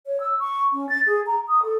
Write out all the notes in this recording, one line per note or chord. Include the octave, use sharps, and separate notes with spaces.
C#5
E6
C#6
C#4
A6
G#4
A#5
D#6
A4